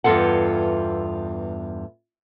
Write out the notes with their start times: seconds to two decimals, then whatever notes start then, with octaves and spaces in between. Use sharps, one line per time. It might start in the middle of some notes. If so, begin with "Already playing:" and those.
0.04 E2 G2 B3 F4 A4 F#5